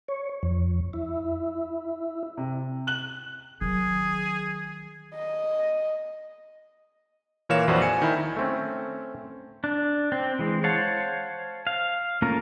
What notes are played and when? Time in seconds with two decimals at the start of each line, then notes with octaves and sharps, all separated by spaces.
0.08 C#5
0.43 F2
0.93 E4
2.37 C3
2.87 F#6 F#7
3.61 D#3 F#3 G#4
5.14 D#5
7.49 A#2 E3 A#4 C#5 F5 E7
7.68 A#1 F2 E3 F#4 C5 D5
7.82 G#5 C#7
8.02 D#3 E4
8.36 A3 C4 C#4
9.64 D4
10.12 C4
10.39 E3 G#3
10.64 C5 C#5 F5 F#5 A5
11.67 F5
12.22 A3 A#3 C#4 F4 A#4